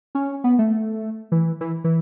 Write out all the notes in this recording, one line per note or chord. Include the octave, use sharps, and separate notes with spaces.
C#4
B3
A3
E3
E3
E3